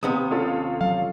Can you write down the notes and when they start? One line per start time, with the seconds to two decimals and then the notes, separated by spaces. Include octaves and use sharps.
0.03 D#2 C3 B3 D#6
0.31 C#4 F4 A4
0.81 F#3 F5